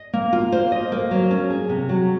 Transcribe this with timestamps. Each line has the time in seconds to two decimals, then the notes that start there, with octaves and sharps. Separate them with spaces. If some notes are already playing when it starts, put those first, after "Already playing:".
Already playing: D#5
0.13 A#3
0.33 F4
0.52 C5
0.72 D#5
0.92 A#3
1.11 F#3
1.31 C#4
1.50 G#4
1.69 C3
1.89 F#3